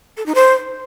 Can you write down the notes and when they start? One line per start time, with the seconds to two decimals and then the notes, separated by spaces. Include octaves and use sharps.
0.17 A4
0.26 D#4
0.35 C5